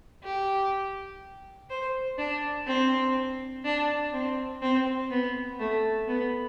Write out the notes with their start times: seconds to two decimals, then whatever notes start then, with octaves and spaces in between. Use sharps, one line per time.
0.24 G4
1.70 C5
2.18 D4
2.67 C4
3.65 D4
4.13 C4
4.62 C4
5.10 B3
5.59 A3
6.08 B3